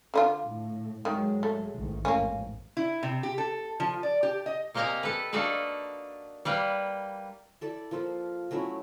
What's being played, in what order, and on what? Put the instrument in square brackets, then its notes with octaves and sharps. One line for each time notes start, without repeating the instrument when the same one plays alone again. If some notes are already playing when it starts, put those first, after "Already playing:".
[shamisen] D3 D#4 F4
[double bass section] A2
[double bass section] G#2 F#3 G#3 [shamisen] D#3
[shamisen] A3
[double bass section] A1 G#2 D#3
[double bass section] A1 F2 G#2 [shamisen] A#3 C#4
[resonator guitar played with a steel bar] E4
C3
G4
A4
F3
D5
G4
D#5
[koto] C3 A#3 G4 D#5 G#5 A#5
A4 B4
A#3 D4 D#4 F#4 A4 B4
G3 A#3 B4
[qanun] E4 A4 D5
F3 A#3 F4 A4
F#3 A3 C#4 E4